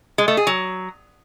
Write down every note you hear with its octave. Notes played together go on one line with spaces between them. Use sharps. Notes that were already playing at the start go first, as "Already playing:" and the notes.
G#3
A3
G#4
F#3